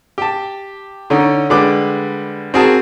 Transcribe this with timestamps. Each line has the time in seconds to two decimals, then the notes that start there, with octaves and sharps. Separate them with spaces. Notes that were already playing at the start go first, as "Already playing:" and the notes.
0.18 G4 A5
1.10 D3 C#4 D#4
1.50 D3 G3 G#3 B4 D6
2.54 C4 F#4 G#4 A#4 A5